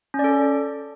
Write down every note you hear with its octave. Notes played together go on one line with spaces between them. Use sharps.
C#4
D5
A4